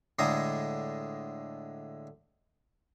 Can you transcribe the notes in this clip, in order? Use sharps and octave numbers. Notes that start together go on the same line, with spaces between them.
A2 D3 G#3 G#4 A#5